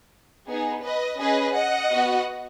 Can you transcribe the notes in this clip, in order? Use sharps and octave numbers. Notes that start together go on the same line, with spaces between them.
B3 D#4 G#4
B4 D#5
C#4 G#4 B4 D#5
D#5 F#5
B3 F#4